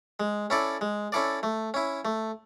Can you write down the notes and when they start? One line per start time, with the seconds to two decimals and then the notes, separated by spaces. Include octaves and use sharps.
0.20 G#3
0.50 C#4 E4 A4 D5
0.81 G#3
1.12 C#4 E4 A4 D5
1.43 A3
1.74 C#4 E4
2.05 A3